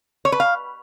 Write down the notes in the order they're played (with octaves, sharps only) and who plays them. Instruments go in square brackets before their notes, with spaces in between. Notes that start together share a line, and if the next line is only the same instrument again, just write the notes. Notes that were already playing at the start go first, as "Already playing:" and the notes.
[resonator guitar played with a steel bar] C#5
B4
F5